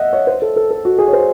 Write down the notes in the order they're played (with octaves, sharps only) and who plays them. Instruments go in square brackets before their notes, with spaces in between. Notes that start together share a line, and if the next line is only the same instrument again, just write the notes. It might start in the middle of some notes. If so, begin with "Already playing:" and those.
Already playing: [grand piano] D#5 E5 F#5
C#5
C5
A4
A4
A4
F#4
G#4
C#5
C5